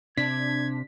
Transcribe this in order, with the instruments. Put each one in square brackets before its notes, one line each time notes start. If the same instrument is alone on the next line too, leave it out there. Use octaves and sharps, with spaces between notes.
[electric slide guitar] C3 [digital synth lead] D4 [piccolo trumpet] G#6 [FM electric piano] B6